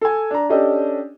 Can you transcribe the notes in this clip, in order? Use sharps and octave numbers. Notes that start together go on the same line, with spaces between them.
A4 G#5
D4 A#5
C#4 D4 G4 A4 D#5